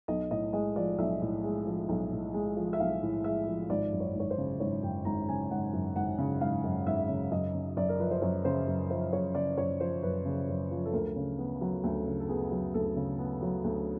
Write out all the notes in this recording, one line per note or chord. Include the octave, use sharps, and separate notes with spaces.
B1 D#5
A2 D#5
G#3 D#5
F3 D5
B1 E5
A2
G#3
F3
B1
A2
G#3
F3
E5
B1 F5
A2
G#3 E5
F3
G#1 D5
F#2
C#5
G#1
C#5
C5
C#3
G#1 C#5
F#2 G5
G#1 A#5
C#3 G#5
G#1 F#5
F#2
G#1 F#5
C#3
G#1 F5
F#2
G#1 E5
C#3
F#2 D#5
C#3
F#2 D5
A#4
F3 B4
C5
F#2 C#5
C#3 C5
F#2
F3 C5
F#2 C#5
C#3 D5
F#2 C#5
F3 C5
F#2 B4
C#3
F#2
F3
A4
D2 A#4
C#3
B3
F#3
D2 A4
C#3
A4
B3 G#4
F#3
D2 A4
C#3
B3
F#3
D2